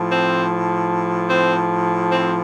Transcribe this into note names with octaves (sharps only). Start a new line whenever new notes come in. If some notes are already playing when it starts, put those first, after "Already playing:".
Already playing: A2 F3
C4
C4
C4